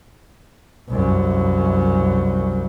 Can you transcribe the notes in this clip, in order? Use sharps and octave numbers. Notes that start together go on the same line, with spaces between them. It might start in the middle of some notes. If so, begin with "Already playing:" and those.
C2 F#2